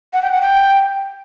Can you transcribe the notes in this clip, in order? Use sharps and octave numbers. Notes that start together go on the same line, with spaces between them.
F#5
G5
F#5
G5